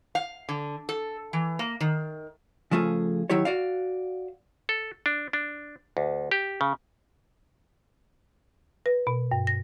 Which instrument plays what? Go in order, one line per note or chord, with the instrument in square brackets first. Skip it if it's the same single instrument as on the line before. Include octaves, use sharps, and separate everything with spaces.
[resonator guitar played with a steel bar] F5
D3
A4
E3
A#3
D#3
[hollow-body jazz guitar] C#3 F3 A3 F4 G#4
D#3 F#3 E4 G4 C#5
F#4 D5 F5
[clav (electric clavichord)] A4
D4
D4
D2
G4
C#3
[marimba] B4
B2
G2
A#6